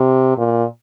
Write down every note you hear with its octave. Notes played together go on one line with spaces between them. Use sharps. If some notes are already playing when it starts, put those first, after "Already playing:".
Already playing: C3
A#2